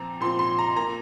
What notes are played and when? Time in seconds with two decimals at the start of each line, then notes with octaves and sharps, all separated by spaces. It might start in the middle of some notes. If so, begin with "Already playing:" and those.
Already playing: A#2 F3 C4 A#5
0.21 A#2 F3 C4 C6
0.39 C6
0.58 A#5
0.76 A#2 A#3 A#5